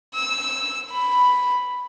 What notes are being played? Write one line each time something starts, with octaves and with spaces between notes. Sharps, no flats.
E6
B5